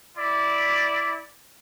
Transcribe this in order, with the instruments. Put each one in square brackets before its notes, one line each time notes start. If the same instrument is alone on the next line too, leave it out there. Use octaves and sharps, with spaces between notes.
[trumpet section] E4 D5